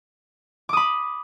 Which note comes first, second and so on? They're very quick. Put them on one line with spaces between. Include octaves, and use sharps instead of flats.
D6 D#6 B5